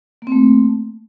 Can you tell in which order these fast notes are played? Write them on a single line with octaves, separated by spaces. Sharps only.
A#3 C4 A3